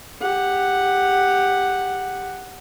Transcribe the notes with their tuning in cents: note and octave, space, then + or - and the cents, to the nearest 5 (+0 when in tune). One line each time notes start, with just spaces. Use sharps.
G4 +15 F#5 +0